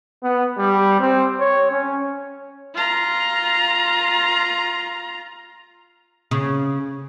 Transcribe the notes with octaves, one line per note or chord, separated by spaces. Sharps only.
B3
G3
C4
C#5
C#4
F4 A#5
C#3